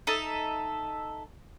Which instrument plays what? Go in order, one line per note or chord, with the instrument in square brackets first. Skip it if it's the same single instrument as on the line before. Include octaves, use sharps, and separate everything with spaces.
[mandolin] D#4 A4 E5